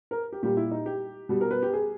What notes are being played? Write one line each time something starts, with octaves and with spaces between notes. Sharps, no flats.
A#4
G4
A#2 G3 G4
E4
D#4
G4
B2 G3
A#4
B4
G4
G#4